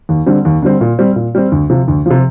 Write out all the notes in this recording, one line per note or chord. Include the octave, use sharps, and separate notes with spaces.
D#2
D3 G3 C4
D#2
D3 G3 C4
A#2
G3 C4
A#2
G3 C4
D2
C3 F3
D2
C3 F3